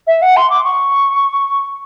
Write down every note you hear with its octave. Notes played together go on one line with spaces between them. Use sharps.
E5
F#5
C6
D6
C#6